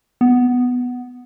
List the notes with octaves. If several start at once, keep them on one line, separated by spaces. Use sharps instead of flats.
B3